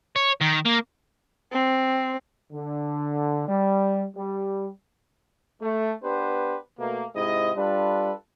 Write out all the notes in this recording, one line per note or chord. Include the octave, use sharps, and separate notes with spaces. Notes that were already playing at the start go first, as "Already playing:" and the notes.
C#5
D#3
A#3
C4
D3
G3
G3
A3
B3 D4 G4 B4 C5
B2 A3 A#3
G#2 C3 E4 D#5
G3 D4 F4 A4 B4